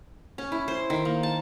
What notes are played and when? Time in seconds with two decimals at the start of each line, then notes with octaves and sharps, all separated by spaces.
0.38 C#4
0.52 E4
0.68 C5
0.90 D#3
1.05 A#3
1.23 A5